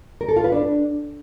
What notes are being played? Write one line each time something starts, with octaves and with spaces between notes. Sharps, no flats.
A#4
A4
F4
B4
D4